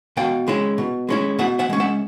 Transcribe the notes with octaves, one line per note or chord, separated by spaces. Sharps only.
B2 F5 G5
G#3 C#4 E4
B2
G#3 C#4 E4
B2 E5 F#5
E5 F#5
G#3 C#4
E5 F#5